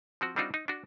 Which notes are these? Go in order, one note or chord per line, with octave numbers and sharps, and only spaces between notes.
F3 C4 F#4
G3 C4 D4 D#4 F4 F#4
D#4
D4 F#4